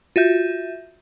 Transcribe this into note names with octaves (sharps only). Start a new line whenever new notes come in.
F4 F#4 E5 G6